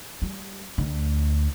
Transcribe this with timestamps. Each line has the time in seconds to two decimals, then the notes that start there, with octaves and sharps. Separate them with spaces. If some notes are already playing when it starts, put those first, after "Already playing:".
0.22 G3
0.78 D2